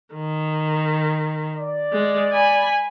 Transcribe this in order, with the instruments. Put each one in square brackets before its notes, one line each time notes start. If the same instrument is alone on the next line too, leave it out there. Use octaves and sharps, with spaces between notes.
[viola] D#3
[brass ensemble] D5
[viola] G#3
G#5 B5